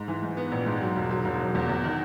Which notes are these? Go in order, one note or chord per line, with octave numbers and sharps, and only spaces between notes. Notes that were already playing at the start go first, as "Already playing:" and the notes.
Already playing: G#2
E3
G#2
B3
A#1
G#2
F#3
E1
F#3
E1
F#3
E2
E2
D#3